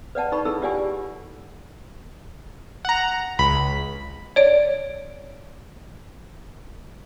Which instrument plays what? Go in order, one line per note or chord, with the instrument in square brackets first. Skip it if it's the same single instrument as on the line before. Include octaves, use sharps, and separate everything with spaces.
[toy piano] B4 D5 F#5 A5
D#4 B4 B5 C#6
E4 G#4 A4 B5 E6
F4 G4 D5 F#5 G#5
[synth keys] F#5 A#5
C#2 B5
[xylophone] C#5 D5 D7